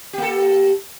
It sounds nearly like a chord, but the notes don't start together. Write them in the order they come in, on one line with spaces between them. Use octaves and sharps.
G4 A#3 A4